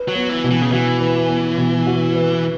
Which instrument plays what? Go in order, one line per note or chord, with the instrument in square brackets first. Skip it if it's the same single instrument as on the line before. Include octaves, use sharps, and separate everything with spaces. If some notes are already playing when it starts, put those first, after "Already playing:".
Already playing: [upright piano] B4
[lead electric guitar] F#3
[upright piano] B3
[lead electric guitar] E3
[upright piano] B2
[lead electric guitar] E3
C#3
[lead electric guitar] E3 [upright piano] F#4
[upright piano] B4
B3
B2
F#4
B4